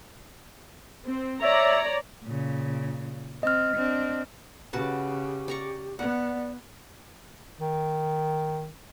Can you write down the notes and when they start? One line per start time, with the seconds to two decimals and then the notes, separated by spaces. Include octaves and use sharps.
1.06 C4
1.42 C#5 D5 E5 A#5
2.25 A#2 C#3
3.43 C4 D#5 F6
3.76 C4 D4
4.73 C#3 F#4 G4 B4 A5
5.48 D5 A#5 C#6
5.99 B3 D5 F#5
7.59 D#3